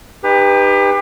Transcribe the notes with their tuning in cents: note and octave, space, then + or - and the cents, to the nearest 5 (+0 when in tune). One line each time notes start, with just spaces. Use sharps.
D#4 -25 G4 +30 B4 +0